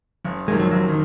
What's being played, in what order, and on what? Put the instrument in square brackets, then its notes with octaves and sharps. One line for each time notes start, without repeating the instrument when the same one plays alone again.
[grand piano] F#1
[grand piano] F2 C3 D#3 A#3 [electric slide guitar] G#3
[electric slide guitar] F#3
[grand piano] F#1 [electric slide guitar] F#3
[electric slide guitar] D#3